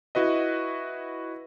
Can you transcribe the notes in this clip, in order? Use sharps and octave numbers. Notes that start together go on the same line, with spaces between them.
E4 F#4 B4 D#5